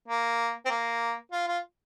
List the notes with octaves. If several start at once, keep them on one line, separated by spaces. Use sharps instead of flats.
A#3
C4
A#3
F4
F4